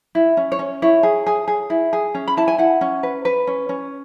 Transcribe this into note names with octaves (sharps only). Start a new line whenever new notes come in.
E4
C#4
C#5
C#4
E4 C#5
G#4
G#4
G#4
E4
G#4
C#4
B5
E4 A5
G#5
E4 F#5
C#4
B4
B4
C#4
C#4